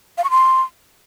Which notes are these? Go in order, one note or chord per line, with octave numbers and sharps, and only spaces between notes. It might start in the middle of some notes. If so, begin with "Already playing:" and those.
F5
C#6
C6